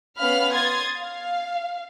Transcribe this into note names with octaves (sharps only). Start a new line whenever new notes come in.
B3 C#4 F5 B5 F6
C6 D#6 G#6 A6
F5